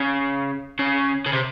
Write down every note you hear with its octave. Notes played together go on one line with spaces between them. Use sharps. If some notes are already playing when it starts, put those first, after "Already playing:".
Already playing: C#3
C#3
C#3
C3